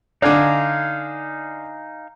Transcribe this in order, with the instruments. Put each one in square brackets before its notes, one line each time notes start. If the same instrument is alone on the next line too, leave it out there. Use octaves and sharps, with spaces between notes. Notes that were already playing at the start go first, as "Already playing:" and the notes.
[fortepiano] D3 D4 [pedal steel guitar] D#4 F5 G#5